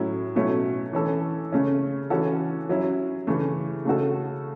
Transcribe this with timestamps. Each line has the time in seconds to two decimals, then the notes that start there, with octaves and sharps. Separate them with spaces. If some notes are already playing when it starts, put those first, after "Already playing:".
Already playing: A2 F#3 C#4 E4
0.35 B2 F#3 A3 C#4 E4
0.93 E3 C#4 A4
1.52 C#3 A3 C#4
2.10 E3 C#4 F#4 A4
2.69 F#3 C#4 E4
3.27 C#3 E3 A3
3.85 C#3 A3 F#4 A4